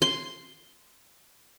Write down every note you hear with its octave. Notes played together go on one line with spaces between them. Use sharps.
C6